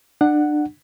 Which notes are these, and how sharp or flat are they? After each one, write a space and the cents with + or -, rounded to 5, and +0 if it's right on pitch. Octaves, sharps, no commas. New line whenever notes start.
D4 +30 F#5 +0